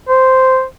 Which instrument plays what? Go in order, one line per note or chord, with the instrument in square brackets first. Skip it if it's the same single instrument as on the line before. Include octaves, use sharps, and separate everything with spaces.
[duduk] C5